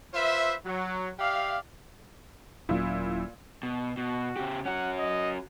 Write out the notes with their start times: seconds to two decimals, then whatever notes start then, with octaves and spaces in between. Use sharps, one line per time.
0.14 F4 B4 C5 E5
0.65 F#3
1.19 G4 D5 E5 F5
2.69 D#1 A#2 F#3 C#4 E4
3.63 B2
3.97 B2 F#4
4.37 C#3 G4
4.65 C#4 F#4 F#5
4.99 D#5